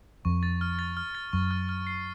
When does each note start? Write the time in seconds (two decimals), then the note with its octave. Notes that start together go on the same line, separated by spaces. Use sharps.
0.25 F2 C#6
0.43 A6
0.61 F6
0.79 A6
0.97 F6
1.15 A6
1.33 F#2 C#6
1.51 F6
1.69 F6
1.87 C7